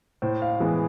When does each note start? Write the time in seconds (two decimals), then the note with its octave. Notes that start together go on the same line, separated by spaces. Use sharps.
0.22 A2 C5
0.42 F5
0.60 E3 G#3 B3